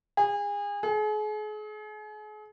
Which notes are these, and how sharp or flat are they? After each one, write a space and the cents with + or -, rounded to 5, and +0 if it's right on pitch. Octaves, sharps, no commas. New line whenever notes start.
G#4 -30
G#4 +40